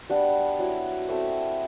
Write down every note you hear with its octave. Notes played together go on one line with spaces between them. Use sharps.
G3 B3 D4 F#5
F#3 B3 E4
A3 C4 E4 E5